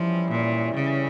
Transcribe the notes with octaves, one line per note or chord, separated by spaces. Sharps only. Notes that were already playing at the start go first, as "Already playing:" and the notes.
Already playing: E3 F3 G3 C#4 E4
A#2
C#3